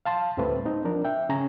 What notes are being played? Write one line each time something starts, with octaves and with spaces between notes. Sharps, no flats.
F5 A5 C6
D2 A2 G3 A3 C4 B4
C4 D#4
F3 D4 A#4
E5 G5
C#3 C#4 C#5 G#5 A#5